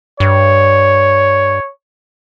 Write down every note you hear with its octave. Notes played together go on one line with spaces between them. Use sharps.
G2 C#5